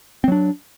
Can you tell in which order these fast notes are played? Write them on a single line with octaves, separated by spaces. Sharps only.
C4 F#3 D4